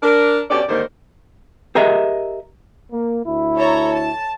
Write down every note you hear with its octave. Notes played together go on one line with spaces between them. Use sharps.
D4 A#4
B2 C#4 G4 A4 D5
G#2 D3 D#3 G3 A#3 C5
G4 G#4 A#4 D#5 E5
A#3
D2 E4
A4 C#5 A#5
A5